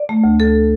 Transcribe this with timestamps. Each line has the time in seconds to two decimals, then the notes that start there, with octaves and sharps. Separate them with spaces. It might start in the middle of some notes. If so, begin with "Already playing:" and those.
Already playing: D5
0.09 A3
0.24 D2
0.40 D2 A4